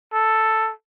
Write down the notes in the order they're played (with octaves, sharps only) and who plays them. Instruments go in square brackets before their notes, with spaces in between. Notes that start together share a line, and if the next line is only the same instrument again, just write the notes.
[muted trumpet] A4